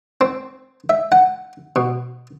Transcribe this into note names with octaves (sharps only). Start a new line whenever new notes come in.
C4
E5
F#5
B2